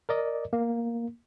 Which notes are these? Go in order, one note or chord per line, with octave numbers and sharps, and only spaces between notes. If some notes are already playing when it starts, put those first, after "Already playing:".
A#4 D5 D#5
A#3